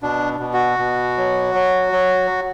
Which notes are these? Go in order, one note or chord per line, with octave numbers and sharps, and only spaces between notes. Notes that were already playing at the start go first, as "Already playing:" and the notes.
B2 D4
B2
F#4
B2
F#3
F#3
F#3